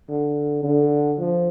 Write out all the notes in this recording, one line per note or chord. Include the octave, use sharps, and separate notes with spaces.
D3
D3
F3